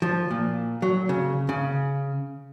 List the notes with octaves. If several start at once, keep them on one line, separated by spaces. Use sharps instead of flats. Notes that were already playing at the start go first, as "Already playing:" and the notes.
F3
A#2
F#3
C#3
C#3